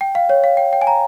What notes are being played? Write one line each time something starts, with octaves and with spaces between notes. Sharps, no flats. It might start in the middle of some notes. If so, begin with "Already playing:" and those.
G5
F5
C#5
F5
G5
G5
G#5
A#5